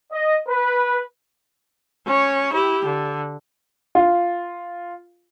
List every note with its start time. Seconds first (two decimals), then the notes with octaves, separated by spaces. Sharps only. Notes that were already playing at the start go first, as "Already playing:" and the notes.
0.11 D#5
0.48 B4
2.07 C#4 C#5
2.53 E4 G4
2.85 D3
3.95 F4